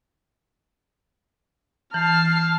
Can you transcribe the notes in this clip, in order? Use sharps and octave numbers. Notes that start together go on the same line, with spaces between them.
E3 A5 F6 C7